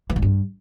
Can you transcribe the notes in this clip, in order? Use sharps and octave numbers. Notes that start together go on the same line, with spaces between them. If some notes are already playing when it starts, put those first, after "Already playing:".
E3
G#2
G2